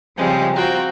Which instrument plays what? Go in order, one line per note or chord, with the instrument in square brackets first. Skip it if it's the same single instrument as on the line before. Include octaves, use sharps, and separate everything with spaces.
[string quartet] C#3 F3 G3 G#3 C4
C4 F4 F#4 G5 A#5